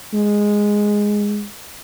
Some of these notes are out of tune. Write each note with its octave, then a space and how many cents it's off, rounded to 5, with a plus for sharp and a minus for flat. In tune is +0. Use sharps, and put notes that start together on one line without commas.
G#3 -5